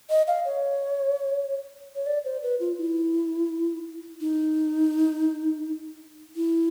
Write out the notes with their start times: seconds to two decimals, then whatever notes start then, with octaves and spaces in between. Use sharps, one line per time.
0.10 D#5
0.28 F5
0.45 C#5
1.95 C#5
2.06 D5
2.25 C5
2.43 B4
2.60 F4
2.78 E4
4.21 D#4
6.36 E4